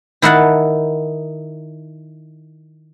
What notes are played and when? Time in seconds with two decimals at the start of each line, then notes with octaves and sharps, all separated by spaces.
0.22 D#3 E4 A#4 F#5 A5